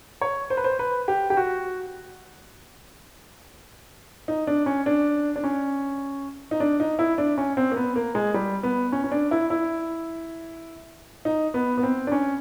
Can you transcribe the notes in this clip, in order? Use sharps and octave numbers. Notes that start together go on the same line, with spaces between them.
C#5
C5
B4
C5
B4
G4
G4
F#4
D#4
D4
C#4
D4
D4
C#4
D#4
D4
D#4
E4
D4
C#4
C4
A#3
B3
A#3
G#3
G3
B3
C#4
C#4
D4
E4
E4
D#4
B3
B3
C4
D4
C#4